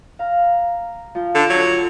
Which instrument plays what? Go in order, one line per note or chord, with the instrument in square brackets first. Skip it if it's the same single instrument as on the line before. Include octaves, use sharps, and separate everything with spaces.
[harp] F5 A#5
F3
[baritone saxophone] D3
F#3